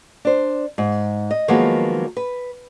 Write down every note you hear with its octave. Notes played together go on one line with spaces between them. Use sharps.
D4 C5
G#2
D#5
D#3 F3 F#3 G#3 A#3 B3
B4